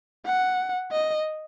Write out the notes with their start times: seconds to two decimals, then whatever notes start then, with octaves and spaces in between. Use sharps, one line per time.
0.26 F#5
0.92 D#5